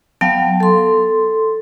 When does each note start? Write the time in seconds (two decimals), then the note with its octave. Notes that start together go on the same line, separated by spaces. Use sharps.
0.21 F#3 B3 F5 G5 A5
0.60 A4 C6